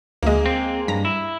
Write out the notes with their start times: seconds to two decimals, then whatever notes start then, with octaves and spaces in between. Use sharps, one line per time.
0.23 D2 G#3 A#3 D#5
0.46 C4
0.88 G2 A#5 A#6
1.05 E4